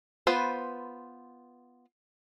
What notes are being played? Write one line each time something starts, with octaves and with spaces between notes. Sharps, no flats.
B3 F4 B4 C5